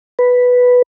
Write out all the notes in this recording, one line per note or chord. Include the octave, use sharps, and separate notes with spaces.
B4